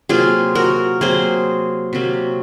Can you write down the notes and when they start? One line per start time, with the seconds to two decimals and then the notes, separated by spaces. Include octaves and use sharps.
0.09 C3 F#3 A#3 F4 G#4
0.55 F#4 A#4
1.01 C3 F#3 A#3 G#4 C5
1.93 C3 F#3 A#3